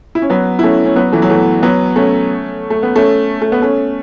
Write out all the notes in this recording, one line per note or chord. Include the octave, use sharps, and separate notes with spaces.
E4
C#4
F#3 B3
E4
A3 C#4
C#4
F#3 B3
E3 A3
F#3
E3 A3
F#3 B3
A3 C#4
A3
B3
A3 C#4
A3
B3
A3 C#4